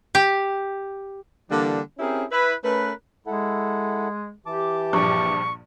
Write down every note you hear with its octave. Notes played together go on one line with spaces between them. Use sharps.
G4
D3 E3 G3 A#3 D4
C4 C#4 E4 G4 G#4 A#4
E4 B4
A3 C#4 A#4 B4
G#3 E4 A4 F#5
E3 G4 A5 D6
A#1 G2 F3 C#6